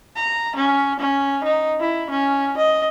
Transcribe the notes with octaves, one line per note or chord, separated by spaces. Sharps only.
A#5
C#4
C#4
D#4
E4
C#4
D#5